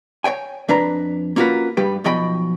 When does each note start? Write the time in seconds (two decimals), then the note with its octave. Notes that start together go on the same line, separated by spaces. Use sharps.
0.24 C#5 D#5 G5 G#5
0.68 F2 D4 B4 A#5
1.36 A#3 C#4 F4 F#4 A#4 B4
1.77 G2 G3 G4 B4
2.04 B1 B2 F3 D#5 G5 B5